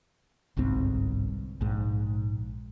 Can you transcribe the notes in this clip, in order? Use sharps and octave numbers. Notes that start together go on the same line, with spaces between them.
G1 C2 G#2 C4
A#1 G#2